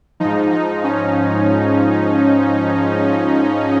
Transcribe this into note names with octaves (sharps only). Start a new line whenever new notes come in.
G#2 F3 D#4
D#4
C#4